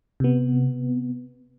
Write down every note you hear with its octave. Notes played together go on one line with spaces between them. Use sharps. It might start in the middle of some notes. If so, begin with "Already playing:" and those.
C3 B3